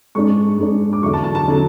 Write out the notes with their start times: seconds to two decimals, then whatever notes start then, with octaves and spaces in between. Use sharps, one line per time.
0.15 G#2 G#3 D4 C#6
0.58 G#2 G#3 D4
0.93 D6
1.02 E2 D3 F#3 C#6
1.13 A5
1.24 A5
1.35 A5
1.48 D3 F#3